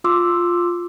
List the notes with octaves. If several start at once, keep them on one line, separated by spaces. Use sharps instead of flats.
F4 C6 D6 E6